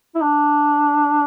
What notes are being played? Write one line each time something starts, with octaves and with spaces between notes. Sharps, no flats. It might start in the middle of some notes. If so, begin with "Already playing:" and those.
E4
D4